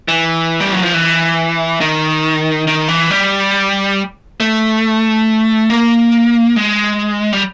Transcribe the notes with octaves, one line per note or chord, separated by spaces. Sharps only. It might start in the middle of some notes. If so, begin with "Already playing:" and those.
E3
G3
F#3
F3
E3
D#3
D#3
E3
G3
A3
A#3
G#3
G3